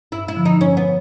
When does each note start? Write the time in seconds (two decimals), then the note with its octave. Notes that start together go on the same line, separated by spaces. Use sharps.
0.12 G2 E4
0.28 E4
0.37 D3 F3
0.45 D#4
0.61 G2 C#4
0.77 B3